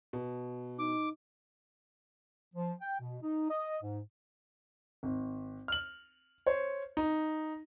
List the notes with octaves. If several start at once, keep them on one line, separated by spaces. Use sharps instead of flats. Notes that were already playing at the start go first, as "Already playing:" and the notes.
B2
D#4 D6
F3
G5
B2
D#4
D#5
G#2
G#1
F6 F#7
C5 C#5
D#4